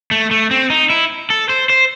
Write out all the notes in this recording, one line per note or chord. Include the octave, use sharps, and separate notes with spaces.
A3
A3
C4
D#4
E4
A4
C5
C5